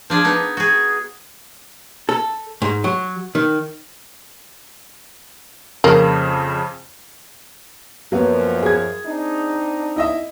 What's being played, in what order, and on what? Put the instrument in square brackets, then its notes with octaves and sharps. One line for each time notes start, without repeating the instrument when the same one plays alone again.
[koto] F3 D4 G#4
B3 D#4
F#4 G#4
[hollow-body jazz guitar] A4
G#2
F#3
D#3
[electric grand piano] F2 C#3 [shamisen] A#3
[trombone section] F#2 F3 [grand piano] F#3 A#3 B3
[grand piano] G#4 G#6
[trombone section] C4 D4 D#4
[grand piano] E4 D#5 E5